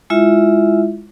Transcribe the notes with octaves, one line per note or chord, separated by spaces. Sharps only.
G#3 E4 F4 E5